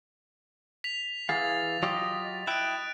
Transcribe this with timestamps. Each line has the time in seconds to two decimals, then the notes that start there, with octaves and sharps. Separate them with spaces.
0.84 B6 F7
1.29 E3 G#4 F5 A6
1.83 F#3 F4 G4 D#5
2.47 E4 G5 F#6 D7